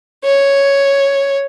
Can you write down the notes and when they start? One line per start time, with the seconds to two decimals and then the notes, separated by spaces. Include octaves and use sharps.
0.24 C#5